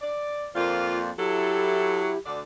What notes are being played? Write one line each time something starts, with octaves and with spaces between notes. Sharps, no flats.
D5
F2 A#3 F4 C5 D5
F#3 E4 G4 A4
D2 D3 D5